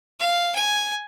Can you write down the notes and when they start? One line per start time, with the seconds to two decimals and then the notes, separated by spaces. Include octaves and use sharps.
0.20 F5
0.55 G#5